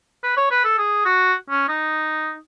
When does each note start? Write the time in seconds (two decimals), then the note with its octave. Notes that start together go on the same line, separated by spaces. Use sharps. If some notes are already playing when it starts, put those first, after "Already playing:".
0.23 B4
0.37 C#5
0.51 B4
0.65 A4
0.78 G#4
1.05 F#4
1.50 C#4
1.68 D#4